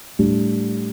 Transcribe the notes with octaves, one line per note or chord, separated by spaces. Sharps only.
A2 G3 D4